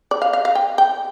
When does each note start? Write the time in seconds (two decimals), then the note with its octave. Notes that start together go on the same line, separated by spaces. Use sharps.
0.11 D5
0.22 F5
0.33 F5
0.45 F5
0.55 G5
0.78 G5